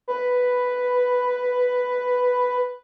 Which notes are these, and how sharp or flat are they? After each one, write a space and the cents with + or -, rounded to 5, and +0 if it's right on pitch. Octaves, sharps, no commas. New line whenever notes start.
B4 +5